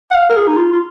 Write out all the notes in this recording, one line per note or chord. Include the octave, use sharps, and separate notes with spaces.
F#5
F5
A#4
G#4
D#4
F4
F4